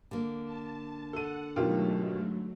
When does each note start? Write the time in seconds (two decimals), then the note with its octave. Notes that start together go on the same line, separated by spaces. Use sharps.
0.11 D3 A#3
0.44 A5
1.13 A4 F#5 D#7
1.56 G#2 B2 D#3 F#3 A3 F4 G4